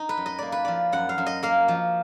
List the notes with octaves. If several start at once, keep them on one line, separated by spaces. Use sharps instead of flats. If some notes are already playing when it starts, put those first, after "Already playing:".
Already playing: D#4
B4
F#2
D#5
A#3 D5
B4
F3 D5
F#2 F#5
F5
F#2
D#5
A#3 F5
F3